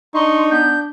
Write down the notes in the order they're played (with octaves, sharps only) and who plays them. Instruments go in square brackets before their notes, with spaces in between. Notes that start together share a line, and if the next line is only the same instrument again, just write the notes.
[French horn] D4 [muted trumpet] D#4 [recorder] C6 [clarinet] C#6
[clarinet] B3 [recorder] G6